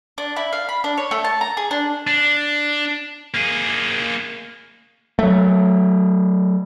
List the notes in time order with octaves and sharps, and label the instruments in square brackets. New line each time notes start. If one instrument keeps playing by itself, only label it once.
[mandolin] D4
E4
F5
B5
D4
C#5
A3
A5
A#5
G#4
D4
[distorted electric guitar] D4
A#3 G#4
[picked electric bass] F#3 A3